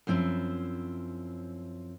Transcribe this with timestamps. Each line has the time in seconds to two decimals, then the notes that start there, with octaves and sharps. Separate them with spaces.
0.07 F#2 F3 C4 E4